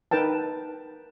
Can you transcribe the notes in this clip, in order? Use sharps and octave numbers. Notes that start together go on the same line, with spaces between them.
D#4 A#4 B4 G5 A5